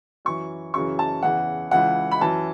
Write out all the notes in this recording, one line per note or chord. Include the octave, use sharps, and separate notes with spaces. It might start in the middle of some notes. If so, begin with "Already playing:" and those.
F#2 E3 C#6
F#2 C#3 E3 C#6
A5
E2 C#3 E3 F#5
C#2 C#3 E3 F#5
B5
F#2 E3 A5